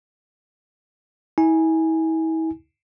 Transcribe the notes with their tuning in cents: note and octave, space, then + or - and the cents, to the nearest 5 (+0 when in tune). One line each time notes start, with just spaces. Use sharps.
E4 -40 G#5 -5